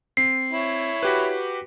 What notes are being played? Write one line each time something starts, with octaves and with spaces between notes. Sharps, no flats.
C4 C7
E4 C#5
F#4 G4 B4